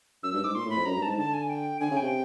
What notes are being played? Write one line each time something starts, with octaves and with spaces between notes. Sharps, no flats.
F#2 E6
G2 E6
G#2 D6
A#2 C6
A2
B5
F2
F#2 A#5
G2
G#2 A5
D3 A5
G#5
G5
D3 G#5
C#3
G5
C3